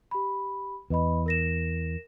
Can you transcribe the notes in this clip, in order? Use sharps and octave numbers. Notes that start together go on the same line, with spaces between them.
G4 B5
E2 B4 D#5 B5
A#4 A#6 E7